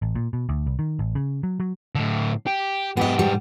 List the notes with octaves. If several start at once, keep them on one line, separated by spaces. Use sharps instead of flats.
A1
A#2
B2
D2
C2
D#3
A1
C#3
F#3
F#3
A2 D3
G4
G#2 B3 G4 D#5
G3